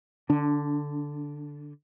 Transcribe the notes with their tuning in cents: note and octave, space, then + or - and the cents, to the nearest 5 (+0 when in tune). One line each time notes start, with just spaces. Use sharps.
D3 +0 D4 -25